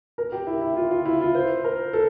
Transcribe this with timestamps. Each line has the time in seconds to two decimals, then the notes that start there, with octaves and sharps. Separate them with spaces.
0.18 A#4
0.32 G4
0.47 E4
0.61 E4
0.76 F4
0.91 F4
1.06 E4
1.21 F4
1.35 C5
1.64 A#4
1.93 A4